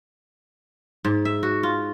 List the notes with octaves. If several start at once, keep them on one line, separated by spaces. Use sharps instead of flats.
G#2
E5
F#4
F4